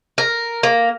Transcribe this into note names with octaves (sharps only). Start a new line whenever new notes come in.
A#4
A#3